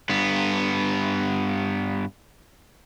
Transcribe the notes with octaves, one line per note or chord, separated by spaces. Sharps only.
G2 B3